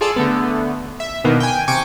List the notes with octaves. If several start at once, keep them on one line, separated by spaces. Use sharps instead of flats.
F4 G#4 A4 D5
D3 A3 B3
E5
B2 D3 D#3 A#3 B3
G5 G#5
C3 G5 G#5 C#6 D6 D7